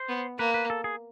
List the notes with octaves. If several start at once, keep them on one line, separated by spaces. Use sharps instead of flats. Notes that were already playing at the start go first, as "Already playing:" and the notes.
Already playing: C5
B3
A#3 B4
B4
A4
G#4